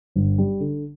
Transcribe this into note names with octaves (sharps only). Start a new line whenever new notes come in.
G1
G3
D3